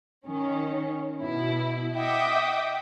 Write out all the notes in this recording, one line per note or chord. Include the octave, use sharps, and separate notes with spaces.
D#3 C#4
B2 E4
D#5 E5 F#5 G5 D6 D#6